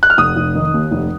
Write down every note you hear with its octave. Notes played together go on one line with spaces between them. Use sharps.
F#6
F6
F1 D#6
F1
D#3
D#2
F1